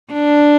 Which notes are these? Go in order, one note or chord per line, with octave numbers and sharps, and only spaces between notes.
D4